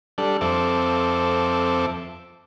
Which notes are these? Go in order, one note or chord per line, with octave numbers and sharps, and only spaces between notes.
G3 D4 A4
F2 C4 A4 E5 D6